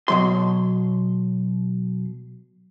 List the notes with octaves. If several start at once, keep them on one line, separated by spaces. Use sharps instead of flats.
B2 F#3 C6